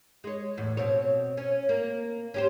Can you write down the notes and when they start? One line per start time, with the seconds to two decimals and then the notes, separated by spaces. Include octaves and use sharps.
0.24 G#3 C#5
0.58 E2 A2
0.77 B2 C4 C#5
1.37 C#4
1.69 A#3
2.34 C#4 G4 C5